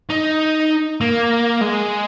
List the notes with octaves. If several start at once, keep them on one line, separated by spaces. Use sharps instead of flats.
D#4
A#3
G#3